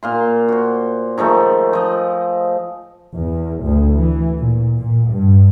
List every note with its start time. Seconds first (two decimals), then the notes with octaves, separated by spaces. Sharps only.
0.03 A#2 F5 C6
0.48 F#4 C5
1.18 D#3 F3 G#3 A3
1.73 F3 D#5
3.15 E2
3.64 D2
3.97 E3
4.40 A#2
4.78 A#2
5.11 G2